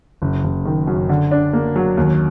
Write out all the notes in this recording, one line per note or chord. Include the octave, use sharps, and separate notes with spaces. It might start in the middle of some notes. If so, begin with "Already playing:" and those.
F#1
F#1
D#3
F#2
D3
D4
A#3
F#3
D#2